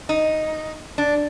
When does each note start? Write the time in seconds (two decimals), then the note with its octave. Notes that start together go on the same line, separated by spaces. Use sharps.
0.09 D#4
0.98 D4